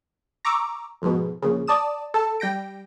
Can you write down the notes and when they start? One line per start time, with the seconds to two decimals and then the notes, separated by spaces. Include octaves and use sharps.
0.45 A#5 C#6 D6 E6
1.02 F2 G#2 B2
1.42 A#1 C#3
1.67 D5 A5 D#6 E7
2.14 A4 A5
2.40 G3 G5 A#6 D7